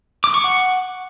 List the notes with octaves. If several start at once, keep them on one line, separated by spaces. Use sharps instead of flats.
D6
C#6
F#5